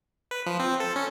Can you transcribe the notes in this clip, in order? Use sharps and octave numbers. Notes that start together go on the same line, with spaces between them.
B4
F3
C4
A4
C#4